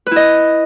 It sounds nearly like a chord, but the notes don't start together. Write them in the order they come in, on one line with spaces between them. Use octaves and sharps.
B4 E4 D#5